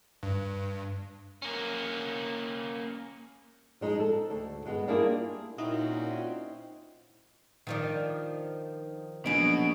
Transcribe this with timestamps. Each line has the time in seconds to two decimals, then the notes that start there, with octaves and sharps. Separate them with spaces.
0.23 G2
1.42 A#3 C#4
3.81 F3 G#3 D#4
4.00 A4
4.30 D2
4.66 G2 G#3 B3
4.88 G3 A#3 D4 E4 F4 G#4
5.58 A#2 C4 C#4 D#4 E4 F#4 D#5
7.67 D#3 F3 D4
9.26 A#1 B2 F#3 C#4 D7